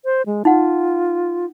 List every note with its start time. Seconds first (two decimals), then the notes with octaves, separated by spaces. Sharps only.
0.05 C5
0.26 G#3
0.45 D#4 F4 F#5